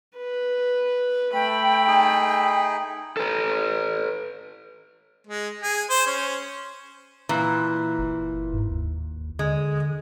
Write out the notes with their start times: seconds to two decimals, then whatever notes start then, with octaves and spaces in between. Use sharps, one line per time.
0.17 B4
1.34 A3 G5 B5
1.87 D#4 G#4
3.17 A4 B4
5.27 G#3
5.61 G#4
5.90 C5
6.07 C#4
7.29 A#2 E3
7.99 F#1
8.54 G#2
8.70 D#2
9.39 D3 G#3